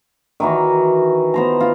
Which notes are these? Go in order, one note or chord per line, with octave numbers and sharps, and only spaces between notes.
D#3 E3 F#4
B3 C5 A#5
F4